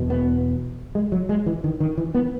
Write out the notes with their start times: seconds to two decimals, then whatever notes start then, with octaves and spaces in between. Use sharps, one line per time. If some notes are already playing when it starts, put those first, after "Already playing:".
Already playing: E2 B2
0.10 B3
0.95 G#3
1.12 F#3
1.29 G#3
1.46 E3
1.64 D#3
1.80 D#3
1.98 E3
2.15 B3